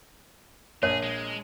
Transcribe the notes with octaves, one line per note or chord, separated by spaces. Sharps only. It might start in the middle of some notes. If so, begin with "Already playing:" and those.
A#1 G#4 C#5
G#3